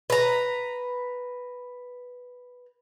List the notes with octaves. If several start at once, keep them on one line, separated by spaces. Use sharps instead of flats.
B4 A#5